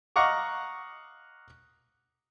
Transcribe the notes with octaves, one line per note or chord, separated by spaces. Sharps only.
D#5 F5 F#5 A#5 C#6 D6